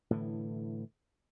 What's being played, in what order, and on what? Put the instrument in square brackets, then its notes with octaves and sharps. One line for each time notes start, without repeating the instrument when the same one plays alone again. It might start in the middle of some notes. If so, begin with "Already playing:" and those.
[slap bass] A2 D3 E3